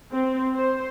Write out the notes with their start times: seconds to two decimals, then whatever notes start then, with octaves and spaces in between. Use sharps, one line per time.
0.11 C4
0.56 C5